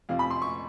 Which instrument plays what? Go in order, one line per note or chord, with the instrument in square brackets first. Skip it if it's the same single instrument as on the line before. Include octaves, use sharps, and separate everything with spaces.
[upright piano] F2 C3 F3 F5
B5
C6
C#6